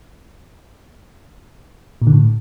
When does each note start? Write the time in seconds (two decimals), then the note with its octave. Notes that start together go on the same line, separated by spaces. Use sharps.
2.02 A#2
2.07 D3
2.12 A2